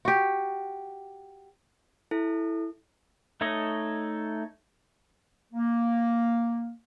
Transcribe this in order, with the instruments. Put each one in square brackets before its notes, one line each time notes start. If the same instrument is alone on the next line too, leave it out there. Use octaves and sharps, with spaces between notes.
[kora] F#4 G4
[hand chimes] E4 A4
[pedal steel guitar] A3 D#4 A4 C#5 D#5
[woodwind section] A#3